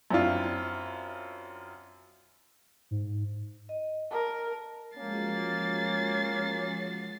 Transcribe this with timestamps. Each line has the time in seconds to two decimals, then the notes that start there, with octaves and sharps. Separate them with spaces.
0.11 F#2 C4 D4 E4 F4
2.91 G#2
3.69 D#5
4.11 A#4 A5
4.97 F3 G#3 A#3 C#4 F#4 A6 C7